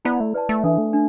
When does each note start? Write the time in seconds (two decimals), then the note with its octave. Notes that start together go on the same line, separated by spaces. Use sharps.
0.05 B3 E4 D5 B5
0.20 A3
0.34 B4 D5 A5
0.49 A3
0.64 E3 D4 A4 E5
0.78 A3
0.93 D4